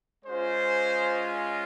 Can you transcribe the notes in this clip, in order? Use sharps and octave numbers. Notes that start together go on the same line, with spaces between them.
G#3 C#4 F4 C5